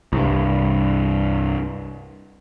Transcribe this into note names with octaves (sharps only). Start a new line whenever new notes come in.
C2 G2